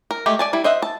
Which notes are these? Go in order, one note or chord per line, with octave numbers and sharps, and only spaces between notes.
A#4
G#3 A3 G4
D5 G#5 A5
G3 E4
C5 D#5 E5 F#5
A5